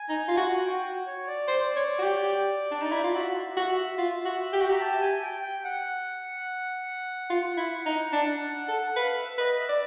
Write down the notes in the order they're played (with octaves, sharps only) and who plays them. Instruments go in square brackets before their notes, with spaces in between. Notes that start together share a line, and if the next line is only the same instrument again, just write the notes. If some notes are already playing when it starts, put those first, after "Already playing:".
Already playing: [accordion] G#5
[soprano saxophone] D#4
F4
F#4
[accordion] G5
C#5
D5
[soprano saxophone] C5
C#5
F#4
G4
D4
D#4
E4
F4
[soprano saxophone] F#4 [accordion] E5
[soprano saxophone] F#4
F4
F#4
G4
F#4
[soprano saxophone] G4 [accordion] A#5
[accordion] A5
G#5
G5
G5
F#5
[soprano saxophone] F4
E4
D#4
D4
A4
[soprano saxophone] B4 [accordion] F5
[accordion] E5
[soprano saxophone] B4 [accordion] D#5
[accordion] E5
[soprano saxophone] D5